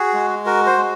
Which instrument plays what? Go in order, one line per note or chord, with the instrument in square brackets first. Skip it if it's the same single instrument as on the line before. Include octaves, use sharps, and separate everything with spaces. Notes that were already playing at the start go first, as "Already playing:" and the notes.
Already playing: [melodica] F#4 G#4
G#3
F#4 A#4
C5
G#3